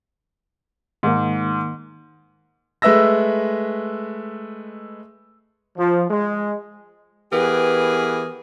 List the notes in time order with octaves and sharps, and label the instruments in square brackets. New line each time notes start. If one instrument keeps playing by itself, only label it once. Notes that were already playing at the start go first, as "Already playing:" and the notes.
[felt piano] G#2 [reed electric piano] D#3 A#3
[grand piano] G#3 A3 B4 E5 E6 A#6
[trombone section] F3
G#3
[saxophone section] E3 B3 G4 G#4 A#4 B4